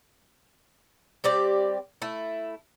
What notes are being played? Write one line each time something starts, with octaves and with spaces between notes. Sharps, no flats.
G3 C4 G4 D5
A3 E4